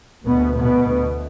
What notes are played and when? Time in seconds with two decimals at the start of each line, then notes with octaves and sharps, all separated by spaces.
0.25 D2 B2 B3
0.55 B2 B3
0.86 D2